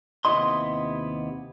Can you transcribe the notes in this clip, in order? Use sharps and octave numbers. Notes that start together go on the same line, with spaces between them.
D#2 C3 B3 E4 D#5 C6